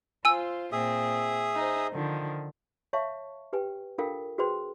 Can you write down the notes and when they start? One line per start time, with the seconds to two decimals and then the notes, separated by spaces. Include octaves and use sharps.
0.25 F4 C5 G#5 E6
0.72 A#2 C4 G#4 E5 D#6
1.55 D#4 C5
1.92 D3 D#3 F3
2.93 C#5 E5 F5 A5 C#6
3.53 G4 B4 G5 G#5
3.98 D4 F4 A4 A#4 F5 G5
4.38 F#4 G#4 B4 C5 G5 C6